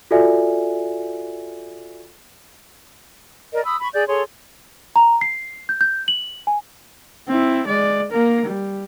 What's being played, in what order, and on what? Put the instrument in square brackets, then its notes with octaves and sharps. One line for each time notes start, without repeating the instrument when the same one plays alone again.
[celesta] F4 F#4 A4 D5 E5 G#5
[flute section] A#4 D5 D#5
B5 D#6 E6
B5 C#6
G#4 D5 G6
G#4 A4 C#5 C6
[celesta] A#5
C7
G6
G6
F#7
G#5
[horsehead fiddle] C4 E4
G#3 D5
A#3 A#4
G3